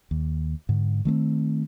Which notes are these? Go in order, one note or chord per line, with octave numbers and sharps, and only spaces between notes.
D#2
G#2 D3
D#3 A3 A#3 C4